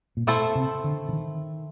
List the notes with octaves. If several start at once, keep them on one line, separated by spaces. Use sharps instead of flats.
A#2
B2 A3 C4 E4 A4 C5
C3
D3
D3
D#3